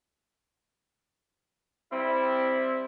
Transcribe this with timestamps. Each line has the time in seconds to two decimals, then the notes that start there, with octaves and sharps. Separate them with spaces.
1.93 G3 C4 E4